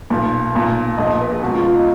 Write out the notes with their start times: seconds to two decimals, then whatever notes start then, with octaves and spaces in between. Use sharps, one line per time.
0.10 B1 A#2
0.54 B1 A#2
0.98 A#1 A#2 D#5
1.21 B4
1.32 G#4
1.42 C#2 B2 F#4
1.54 F4
1.64 F4
1.75 D#4